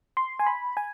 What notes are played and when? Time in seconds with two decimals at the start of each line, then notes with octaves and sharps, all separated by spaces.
0.17 C6
0.39 G#5
0.46 B5
0.77 G#5